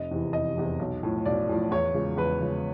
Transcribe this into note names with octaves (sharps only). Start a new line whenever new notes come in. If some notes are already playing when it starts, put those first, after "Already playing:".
Already playing: F1 D#5
E2 C3 E3
F1 D#5
E2 C3 E3
B1
A2 F3
B1 D5
A2 F3
E2 C#5
C#3 F3 G#3
E2 B4
C#3 F3 G#3